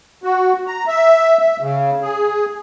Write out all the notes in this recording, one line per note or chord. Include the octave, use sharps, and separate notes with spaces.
F#4
A#5
E5
E5
C#3
G#4